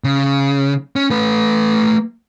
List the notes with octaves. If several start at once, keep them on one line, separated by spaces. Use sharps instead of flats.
C#3
C#4
A3 B4